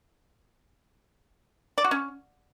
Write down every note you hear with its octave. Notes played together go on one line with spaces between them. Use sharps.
D5
F#4
C#4